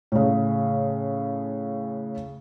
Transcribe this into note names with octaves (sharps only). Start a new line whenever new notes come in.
A2 C#3